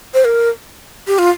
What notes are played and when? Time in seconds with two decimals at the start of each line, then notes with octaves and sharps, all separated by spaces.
0.14 C5
0.25 A#4
1.07 G4
1.19 F4